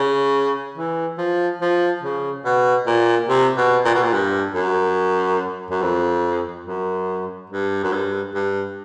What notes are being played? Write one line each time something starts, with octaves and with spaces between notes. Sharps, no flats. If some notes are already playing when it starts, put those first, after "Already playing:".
Already playing: C#3
E3
F3
F3
C#3
B2
A#2
C3
B2
A#2
B2
A#2
G2
F#2
F#2
F2
F#2
G2
F#2
G2
G2